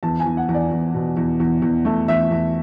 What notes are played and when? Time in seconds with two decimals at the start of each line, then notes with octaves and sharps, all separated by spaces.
0.03 E2 A5
0.20 G#5
0.26 E2
0.37 F#5
0.49 E2
0.54 D5
0.71 E2
0.94 B2
1.17 E2
1.40 E2
1.62 E2
1.85 A3
2.08 E2 E5
2.31 E2